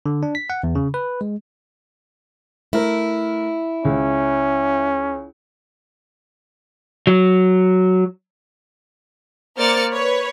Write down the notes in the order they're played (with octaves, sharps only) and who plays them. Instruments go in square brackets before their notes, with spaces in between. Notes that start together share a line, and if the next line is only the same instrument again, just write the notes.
[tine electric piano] D3
D4
B6
F#5
E2
C#3
B4
G#3
[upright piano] A3 A#4 [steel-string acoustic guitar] E4
[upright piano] C#2 [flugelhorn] C#4
[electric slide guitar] F#3
[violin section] A#3 C5 D5 F6 A6 C#7
B4 C#5